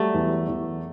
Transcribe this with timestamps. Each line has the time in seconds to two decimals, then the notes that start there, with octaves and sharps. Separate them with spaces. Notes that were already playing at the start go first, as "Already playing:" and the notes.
Already playing: F#3 G3 A3
0.14 E2
0.48 E2